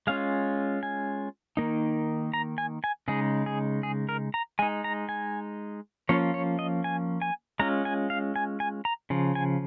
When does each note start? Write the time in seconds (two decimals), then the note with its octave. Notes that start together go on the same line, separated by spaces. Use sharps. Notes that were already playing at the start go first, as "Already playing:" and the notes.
0.07 G#3 C#4 F4 F5
0.83 G#5
1.57 D#3 A#3 D#4
2.34 A#5
2.58 G#5
2.84 G#5
3.08 C#3 G#3 D#4 G#4
3.46 G#4
3.83 G#4
4.09 A#4
4.34 A#5
4.59 G#3 D#4 G#5
4.84 A#5
5.09 G#5
6.09 F3 A#3 C#4 F4 C#5
6.34 C#5
6.59 D#5
6.84 G#5
7.22 G#5
7.59 G#3 C#4 F4 A#5
7.85 G#5
8.10 F5
8.36 G#5
8.60 G#5
8.85 A#5
9.10 C#3 F3
9.35 G#5